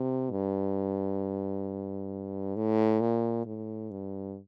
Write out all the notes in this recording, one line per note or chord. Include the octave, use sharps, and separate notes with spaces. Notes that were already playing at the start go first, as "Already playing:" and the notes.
Already playing: C3
G2
A2
A#2
A2
G2